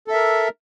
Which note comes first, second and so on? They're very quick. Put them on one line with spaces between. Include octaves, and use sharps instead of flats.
A4 E5 A#4